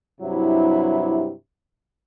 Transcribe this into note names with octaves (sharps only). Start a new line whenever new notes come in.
G2 C3 F#3 E4